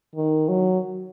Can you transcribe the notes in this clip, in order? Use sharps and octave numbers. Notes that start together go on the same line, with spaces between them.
D#3
F#3